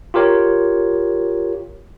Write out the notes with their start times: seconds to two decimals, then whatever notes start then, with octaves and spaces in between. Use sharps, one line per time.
0.14 F4 G4 A#4 C#5